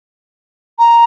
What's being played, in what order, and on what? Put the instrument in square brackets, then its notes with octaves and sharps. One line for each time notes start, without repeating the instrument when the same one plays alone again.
[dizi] A#5